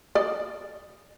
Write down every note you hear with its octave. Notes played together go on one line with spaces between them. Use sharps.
D5 D#5